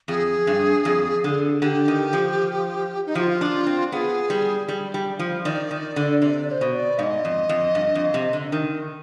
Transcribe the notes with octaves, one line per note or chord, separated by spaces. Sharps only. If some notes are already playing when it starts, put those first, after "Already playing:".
F2 G#4
G2
F2
D3
D3 G4
D#3
F3
D#4
F3 F4 G4
D4
C4
B3 G#4
G3
G3
G3
F3
D#3 D5
D#3
D3
C3 D5
D5
C5
B2
D5
G#2 D#5 F5
F2
F2
G2
F2
C3
D3
D#3